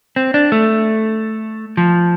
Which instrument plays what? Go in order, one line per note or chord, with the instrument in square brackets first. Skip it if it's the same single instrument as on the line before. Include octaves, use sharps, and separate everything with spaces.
[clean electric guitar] C4
D4
A3
F3